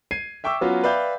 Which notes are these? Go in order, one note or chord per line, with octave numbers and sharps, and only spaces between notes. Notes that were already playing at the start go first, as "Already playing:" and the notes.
G#6 C7 D#7
E5 G5 C#6 D6 E6
F#3 B3 C#4 F4 F#4
B4 D5 E5 F5 G5 G6